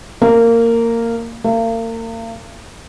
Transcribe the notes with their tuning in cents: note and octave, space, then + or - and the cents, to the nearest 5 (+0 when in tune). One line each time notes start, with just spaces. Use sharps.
A#3 -15
A#3 -40